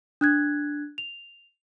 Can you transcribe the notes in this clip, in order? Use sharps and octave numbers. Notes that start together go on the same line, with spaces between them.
D4 F#6 G#6
F7